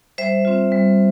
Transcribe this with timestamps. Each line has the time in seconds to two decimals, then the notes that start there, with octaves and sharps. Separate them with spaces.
0.18 G3 C5 E5
0.45 C4 F4
0.72 G3